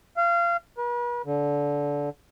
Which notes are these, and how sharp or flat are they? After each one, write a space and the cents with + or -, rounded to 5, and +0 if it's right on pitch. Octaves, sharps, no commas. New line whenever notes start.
F5 -25
B4 -45
D3 -20